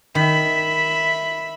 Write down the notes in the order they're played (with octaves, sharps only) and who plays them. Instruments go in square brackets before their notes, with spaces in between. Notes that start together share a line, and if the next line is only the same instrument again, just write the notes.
[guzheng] D#3 [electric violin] E5 B5